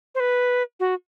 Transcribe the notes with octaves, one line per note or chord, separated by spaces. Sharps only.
C5
B4
F#4